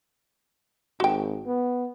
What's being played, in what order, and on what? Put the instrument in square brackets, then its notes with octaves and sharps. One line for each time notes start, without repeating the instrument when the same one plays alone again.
[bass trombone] G#1 [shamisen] F#4 G5
[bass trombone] B3